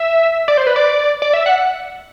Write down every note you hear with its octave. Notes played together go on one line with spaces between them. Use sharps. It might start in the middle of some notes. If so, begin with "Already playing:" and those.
Already playing: E5
D5
C5
B4
D5
D5
E5
F#5